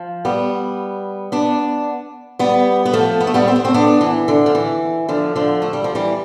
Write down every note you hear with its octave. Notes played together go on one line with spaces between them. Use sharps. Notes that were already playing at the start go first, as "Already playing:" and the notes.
Already playing: F3
G3 B3
B3 D4
G3 B3
B3
F3 A3
B3
A3
G3 B3
C4
B3
A3 C4
B3 D4
E3
D3
F3
E3
D3 F3
D3 F3
A3
G3
F3
E3 G3